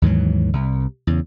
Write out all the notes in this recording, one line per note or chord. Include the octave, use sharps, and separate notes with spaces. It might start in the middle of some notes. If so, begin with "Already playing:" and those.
D#2 G#2 E3 F#3
C2
E2 C#3